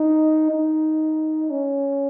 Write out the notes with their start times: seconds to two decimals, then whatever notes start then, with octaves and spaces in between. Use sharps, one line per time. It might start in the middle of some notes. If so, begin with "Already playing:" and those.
Already playing: D#4
0.50 D#4
1.50 C#4